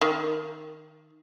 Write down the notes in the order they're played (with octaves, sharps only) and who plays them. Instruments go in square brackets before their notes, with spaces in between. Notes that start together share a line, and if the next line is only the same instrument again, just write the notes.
[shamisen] D#3